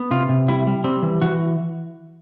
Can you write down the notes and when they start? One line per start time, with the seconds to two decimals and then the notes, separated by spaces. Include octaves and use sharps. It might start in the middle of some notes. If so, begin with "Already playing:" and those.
Already playing: B3
0.11 C3 F4
0.29 C3
0.48 G3 E4
0.67 G3
0.84 G3 C4
1.03 E3
1.22 E3 F#4